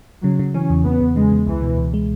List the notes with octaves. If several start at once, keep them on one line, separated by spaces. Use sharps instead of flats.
C#3 F#3
C#3
E3 C#4
E2
E2 B3
E2
C#3 G#3
E2
C#2 E3
B2
C#2
G#3